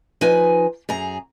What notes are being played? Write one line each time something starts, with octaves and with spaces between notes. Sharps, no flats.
F3 D#4 B4 G#5
F#2 G#4 A#5